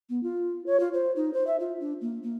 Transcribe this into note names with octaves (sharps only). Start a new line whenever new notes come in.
B3
F4
C#5
F4
C5
D#4
C5
E5
F4
D4
A#3
A#3